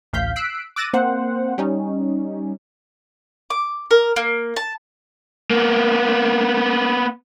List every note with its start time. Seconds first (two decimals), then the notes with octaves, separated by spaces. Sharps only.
0.13 A1 D2 F5 G6 B6
0.36 E6 F#6 B6 C7 D7
0.76 D6 E6 F#6 A6 A#6 D#7
0.93 A#3 C4 C5 F#5
1.58 G3 C#4 D#4
3.50 D6
3.91 A#4
4.16 A#3
4.56 A5
5.50 A#3 B3